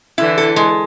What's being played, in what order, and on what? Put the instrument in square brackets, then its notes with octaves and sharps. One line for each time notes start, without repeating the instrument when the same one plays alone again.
[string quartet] D3 E3 [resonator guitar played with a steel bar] E4
[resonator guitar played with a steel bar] A4
G#3